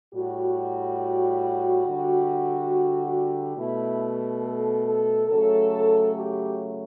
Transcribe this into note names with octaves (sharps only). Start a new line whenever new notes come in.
A2 G3 F#4
D3 G3
B2 A3 E4
A4
A4
C#3 F#3 A3 A4
G4